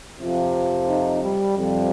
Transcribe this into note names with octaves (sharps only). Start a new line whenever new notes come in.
F2 C3 F3 F4
D#4
G3
F2 C3 F3 G3